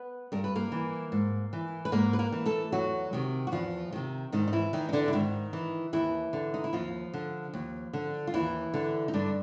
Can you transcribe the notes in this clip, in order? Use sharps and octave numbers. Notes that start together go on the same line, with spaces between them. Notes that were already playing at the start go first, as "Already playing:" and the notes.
Already playing: B3 B4
G2 A#4
B4
A#3 A#4
E3
G#2
E3
B4
G#2 A#3 A#4
B4
A#3 A#4
E3
A3 A4
E2 F#3 F#4
C3 D#3
F#4
E2 F3 F4
C3 D#3
G#2 D#3 D#4
D#4
E3 E4
D#3 E3 D#4
D#4
D3 D4
E4
G#2 D#3 D#4
E3
D#2 E3 E4
D3
D#4
E4
D#2 F3 F4
D3
D#2
D3
F4
D#2 E3 E4
D3
D#4
G2 D3 D4